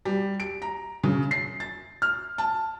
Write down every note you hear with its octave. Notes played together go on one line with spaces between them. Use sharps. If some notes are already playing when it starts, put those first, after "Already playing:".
G3
D7
A#5
C#3
C7
A6
F6
A5